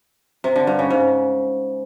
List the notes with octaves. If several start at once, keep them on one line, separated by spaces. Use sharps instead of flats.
C3
D3
G2
C#3
G#2